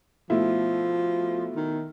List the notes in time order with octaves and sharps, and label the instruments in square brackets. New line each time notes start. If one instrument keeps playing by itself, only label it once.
[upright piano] B2 A3 E4 [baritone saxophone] F3
[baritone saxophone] D#3